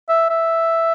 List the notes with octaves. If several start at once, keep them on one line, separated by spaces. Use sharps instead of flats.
E5
E5